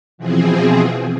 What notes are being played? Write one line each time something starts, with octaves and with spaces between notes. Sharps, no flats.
B2 E3 F3 C4 G#4